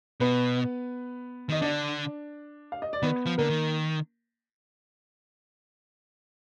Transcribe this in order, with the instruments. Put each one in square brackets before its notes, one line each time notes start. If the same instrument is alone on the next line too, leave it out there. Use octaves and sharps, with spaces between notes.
[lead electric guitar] B2 [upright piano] B3 B4
[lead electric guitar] D#3 [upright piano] D#5
[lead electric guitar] D3 [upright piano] D4 D5
[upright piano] F5
D#5
D5
[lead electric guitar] D#3 [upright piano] B3 B4
[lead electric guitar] F3
[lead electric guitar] D3 [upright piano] A#3 A#4
[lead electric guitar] D#3